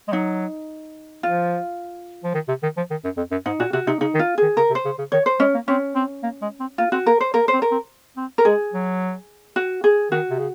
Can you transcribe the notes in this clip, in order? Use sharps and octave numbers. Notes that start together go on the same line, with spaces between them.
G#3
F#3 D#4
F3 F4
F3
D#3
C3
D#3
F3
D#3
F#2
F2
F#2
G#2 D#4
A#2 F#4
C3 F#4
C3 D#4
C#3 D#4
D#3
F4
D#3 G#4
C#3 A#4
C3
C5
C#3
C#3
D#3 C#5
C5
G#3 C#4
A#3
C4 C#4
C4
A#3
G#3
C4
A#3 F4
C4 F#4
A#3 A#4
C5
A#3 A#4
C5
C4
A#4
C4
C4
A#4
G#3 G#4
F#3
F#4
G#4
D#3 F#4
C3
C#3